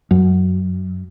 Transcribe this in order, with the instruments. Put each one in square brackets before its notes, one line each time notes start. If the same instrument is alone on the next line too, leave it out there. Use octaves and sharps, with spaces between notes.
[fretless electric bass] F#2